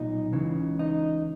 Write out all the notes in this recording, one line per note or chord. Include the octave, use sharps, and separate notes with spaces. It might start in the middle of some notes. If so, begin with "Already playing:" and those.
Already playing: B1 A#2 D#4
C#2 C#3 E3
D#4